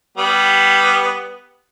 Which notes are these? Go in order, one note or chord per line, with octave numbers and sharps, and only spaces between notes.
G3 B3